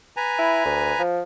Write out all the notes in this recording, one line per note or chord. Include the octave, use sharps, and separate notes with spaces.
B4 G#5 A#5
E4
D2
F3